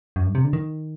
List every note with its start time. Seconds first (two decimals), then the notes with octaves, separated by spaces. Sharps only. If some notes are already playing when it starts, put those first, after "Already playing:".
0.16 F#2
0.26 G2
0.35 C3
0.44 D3
0.53 D#3